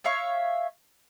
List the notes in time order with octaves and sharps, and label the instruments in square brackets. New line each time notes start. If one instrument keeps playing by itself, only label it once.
[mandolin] C#5 E5 F5 C#6